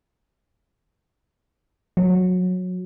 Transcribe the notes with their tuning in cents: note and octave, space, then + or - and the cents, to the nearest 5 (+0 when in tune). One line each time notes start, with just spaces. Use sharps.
F#3 -15